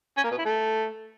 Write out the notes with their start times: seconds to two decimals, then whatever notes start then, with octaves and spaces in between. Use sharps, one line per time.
0.17 C#4
0.24 A#3
0.31 B2
0.38 E4
0.45 A3